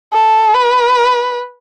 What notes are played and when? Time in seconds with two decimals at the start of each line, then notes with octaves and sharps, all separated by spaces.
0.13 A4
0.54 B4